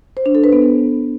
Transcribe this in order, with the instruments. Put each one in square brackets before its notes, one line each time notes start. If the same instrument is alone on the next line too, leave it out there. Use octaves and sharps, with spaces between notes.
[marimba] C5
D4
A4
B4
B3